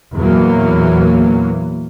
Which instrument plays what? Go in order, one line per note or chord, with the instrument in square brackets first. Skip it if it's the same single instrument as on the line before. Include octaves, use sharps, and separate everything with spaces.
[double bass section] E2 A#2 E3 F#3 A#3